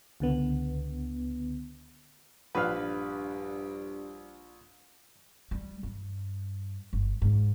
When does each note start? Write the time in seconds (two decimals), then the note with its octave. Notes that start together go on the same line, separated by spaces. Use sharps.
0.20 C#2 D3 B3
2.55 A#1 G2 D4 B4 F5
5.51 G3
5.83 G2
6.93 G1
7.22 G#2